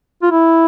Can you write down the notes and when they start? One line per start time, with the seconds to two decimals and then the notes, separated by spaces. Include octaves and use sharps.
0.23 F4
0.31 E4